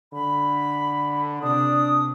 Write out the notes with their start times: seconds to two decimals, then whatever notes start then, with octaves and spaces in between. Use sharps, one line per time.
0.13 D3 B5
1.43 C3 D4 D#6